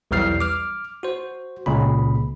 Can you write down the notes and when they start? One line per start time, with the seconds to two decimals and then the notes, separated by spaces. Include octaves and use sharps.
0.11 B1 E2 E3 G3 F6 C7
0.40 D6 F6
1.03 F#4 C5
1.66 C#2 A#2 C#3 B5